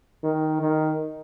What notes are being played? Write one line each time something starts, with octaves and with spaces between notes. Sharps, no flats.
D#3
D#3